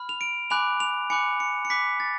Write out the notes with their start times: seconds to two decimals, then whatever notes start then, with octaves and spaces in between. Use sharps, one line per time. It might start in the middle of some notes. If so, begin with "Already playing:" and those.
Already playing: B5 F6
0.09 F7
0.21 D7
0.50 G#5 B5 D6 F#6 F7
0.80 F7
1.10 G#5 B5 D6 F#6 C#7
1.40 C#7
1.65 C#7
1.70 B5 D6 F#6 B6
2.00 A6